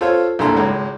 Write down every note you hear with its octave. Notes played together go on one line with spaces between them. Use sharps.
F4 A4 C5 C#5 F5
C2 G2 A#2 A4 A#5 C6
G#1 C#2 G#3